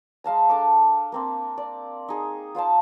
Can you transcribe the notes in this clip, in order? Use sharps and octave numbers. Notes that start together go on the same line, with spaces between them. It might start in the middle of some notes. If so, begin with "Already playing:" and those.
G#3 F5 A5 A#5
D4 A4 D6
A#3 C4 D4
D5
D#4 G#4
F4 F5 G5 A5